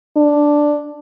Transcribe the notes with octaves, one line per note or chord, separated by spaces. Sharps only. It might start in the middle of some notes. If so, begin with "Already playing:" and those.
D4